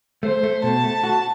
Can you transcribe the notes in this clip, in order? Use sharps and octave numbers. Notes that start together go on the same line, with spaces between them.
A3 C5
A3
B2 A5
A3
F#4